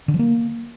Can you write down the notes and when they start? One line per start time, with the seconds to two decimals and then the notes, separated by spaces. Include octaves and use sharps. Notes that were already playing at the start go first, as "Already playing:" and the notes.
0.08 D3
0.14 F3
0.19 A#3